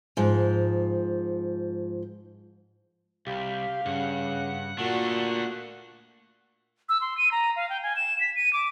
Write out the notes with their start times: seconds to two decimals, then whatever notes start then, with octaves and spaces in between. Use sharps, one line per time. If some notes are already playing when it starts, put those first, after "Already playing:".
0.17 G#2 F3
3.27 C2 G4 F5
3.86 G2 C#3 F#5
4.78 A#2 A3 D4 F#4
6.89 E6
7.01 C6
7.18 D#7
7.32 A#5
7.56 F5
7.70 G5
7.83 G#5
7.96 E7
8.21 B6
8.36 D#7
8.53 D6